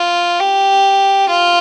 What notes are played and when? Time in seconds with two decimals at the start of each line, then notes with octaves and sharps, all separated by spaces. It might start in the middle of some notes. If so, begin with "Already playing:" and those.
Already playing: F4
0.39 G4
1.29 F4